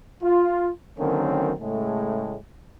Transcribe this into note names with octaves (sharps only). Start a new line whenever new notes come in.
F4
D3 D#3 F#3 A#3 C4 C#4
A2 C#3 G#3 A3